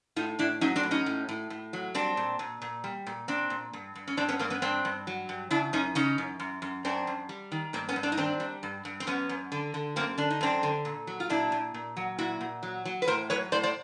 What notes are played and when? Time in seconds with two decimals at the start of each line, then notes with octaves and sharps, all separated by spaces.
0.16 A2 D#4 F4
0.39 A2 D4 E4
0.61 F#3 C#4 D#4
0.76 C4 D4
0.83 A2
0.91 C#4 D#4
1.06 A2
1.29 A2
1.50 A2
1.73 F#3
1.94 G3 C4 D4
2.17 A#2
2.39 A#2
2.62 A#2
2.84 G3
3.07 A#2
3.28 A#2 C4 D4
3.50 A#2
3.73 G2
3.95 G2
4.08 C#4
4.17 G2 C4 D4
4.29 B3 C#4
4.39 G2 A#3 C4
4.50 B3 C#4
4.62 G2 C4 D4
4.85 G2
5.07 F#3
5.29 G2
5.51 C#3 D4 E4
5.73 F#2 C#4 D#4
5.95 C#3 C#4 D#4
6.18 F#2
6.40 F#2
6.62 F#2
6.85 F#2 C4 D4
7.07 F#2
7.29 G3
7.52 D#3
7.73 G2 A#3 C4
7.89 B3 C#4
7.96 G2
8.03 C4 D4
8.12 D#4
8.17 D#3 C4 D4
8.40 G3
8.63 G2
8.85 G2
9.00 C4
9.07 F#2 B3 C#4
9.29 F#2
9.52 D3
9.74 D3
9.96 F#2 A#3 C4
10.18 D3 D4
10.30 D#4
10.41 F#2 C4 D4
10.63 D3
10.85 A#2
11.07 F#3
11.20 F4
11.29 A#2 D4 E4
11.52 A#2
11.74 A#2
11.97 F#3
12.18 A#2 E4 F#4
12.41 A#2
12.63 F#3
12.85 F#3
13.02 B4
13.07 A2 A#4 C5
13.30 F#3 B4 C#5
13.52 A2 C5 D5
13.63 C5 D5